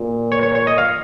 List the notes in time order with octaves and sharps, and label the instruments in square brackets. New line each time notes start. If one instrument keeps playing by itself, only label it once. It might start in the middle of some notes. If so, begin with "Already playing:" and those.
Already playing: [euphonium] A#2
[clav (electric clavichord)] C#5
C#5
C#5
D#5
F5